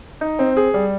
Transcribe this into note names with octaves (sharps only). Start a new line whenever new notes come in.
D#4
C4
G#4
G3